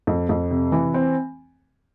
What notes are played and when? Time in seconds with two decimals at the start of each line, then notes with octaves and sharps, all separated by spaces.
0.07 F2
0.29 F2
0.51 C3
0.72 E3
0.94 C4